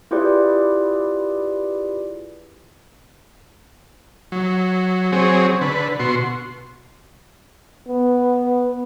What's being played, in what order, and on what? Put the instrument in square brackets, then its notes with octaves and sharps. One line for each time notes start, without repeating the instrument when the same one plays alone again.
[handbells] E4 F4 G4 G#4 B4 D5
[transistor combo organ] F#3
F#3 C4 G#4 C#5
D3 B4
B2 F#4 C6
[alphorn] B3